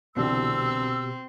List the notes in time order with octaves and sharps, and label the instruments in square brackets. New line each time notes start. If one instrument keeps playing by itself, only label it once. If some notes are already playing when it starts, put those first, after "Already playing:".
[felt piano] C2 D3 E3 [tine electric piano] B2 G4 [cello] C4 [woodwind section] E6